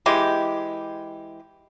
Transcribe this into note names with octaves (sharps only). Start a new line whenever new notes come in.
E3 G#3 G4